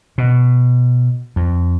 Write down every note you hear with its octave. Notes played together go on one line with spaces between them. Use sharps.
B2
F2